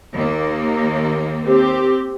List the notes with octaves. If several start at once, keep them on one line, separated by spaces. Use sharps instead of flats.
D#2 A#3
C4 G4